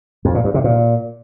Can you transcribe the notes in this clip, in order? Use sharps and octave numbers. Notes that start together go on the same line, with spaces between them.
F2
A#2
G2
C3
A#2